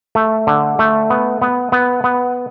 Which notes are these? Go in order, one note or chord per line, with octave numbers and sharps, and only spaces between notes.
A3
D3
A3
B3
B3
B3
B3